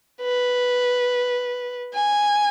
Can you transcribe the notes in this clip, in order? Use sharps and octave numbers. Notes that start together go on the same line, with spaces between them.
B4
G#5